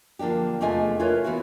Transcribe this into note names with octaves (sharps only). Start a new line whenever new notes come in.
D3 F3 A#3 D4 G4
E2 C3 A3 F4 D#5 G#5
E4 F4 A#4 B4 C#5
E3 B3 E4 F#4